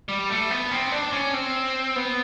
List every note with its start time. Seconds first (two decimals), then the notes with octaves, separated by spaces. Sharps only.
0.09 G3
0.30 A3
0.51 B3
0.71 C4
0.92 D4
1.13 C#4
1.34 C4
1.96 B3